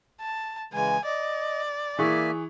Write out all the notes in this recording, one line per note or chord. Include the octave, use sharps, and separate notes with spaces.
A5
C#3 E3 G#3 G#5
D5 D#5
E3 A#3 G#4 E5 G#5 C#6